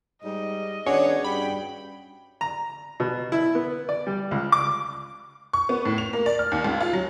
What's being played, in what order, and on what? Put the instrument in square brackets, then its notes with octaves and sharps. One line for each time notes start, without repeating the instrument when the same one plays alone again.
[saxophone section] G#2 G3 [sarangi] D#5
[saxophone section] D#3 B3 D4 [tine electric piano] C#4 F#4 G#4 [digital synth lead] C#5
[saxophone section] G2 [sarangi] G5 [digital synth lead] B5
[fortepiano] A#5
B2
E4
B3
D5
G3
C#2
D6
[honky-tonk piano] C#6
B3
A2
F7
A#3
D5
F6
D#2
C#2
F4
F#3